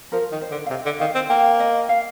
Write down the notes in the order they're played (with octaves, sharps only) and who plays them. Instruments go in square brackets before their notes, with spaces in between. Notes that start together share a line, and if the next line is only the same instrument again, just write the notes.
[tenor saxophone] F3 [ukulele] A#4
[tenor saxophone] D#3
[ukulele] C5
[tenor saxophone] D3
[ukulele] F5
[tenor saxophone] C3 [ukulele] D#5
[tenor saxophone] D3
[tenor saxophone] D#3 [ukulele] F5
[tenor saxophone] C4
[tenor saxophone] A#3 [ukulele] G5
[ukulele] D#5
F5